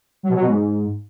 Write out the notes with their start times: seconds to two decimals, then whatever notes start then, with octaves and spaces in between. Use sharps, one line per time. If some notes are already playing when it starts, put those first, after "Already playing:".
0.23 F#3
0.29 B2
0.35 F#3
0.41 B2
0.47 G#2